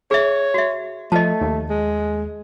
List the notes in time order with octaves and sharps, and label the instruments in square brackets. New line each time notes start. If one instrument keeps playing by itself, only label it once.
[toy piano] G#4 E5 [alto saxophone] C#5
[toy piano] F#4 E5
[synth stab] F3 [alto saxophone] A3 [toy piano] D#5 A5
[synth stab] D#2
[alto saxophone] G#3